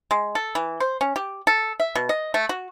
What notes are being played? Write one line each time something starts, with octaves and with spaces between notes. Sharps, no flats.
G#3
A4
E3
C5
C#4
G4
A4
E5
B2
D#5
A3
F#4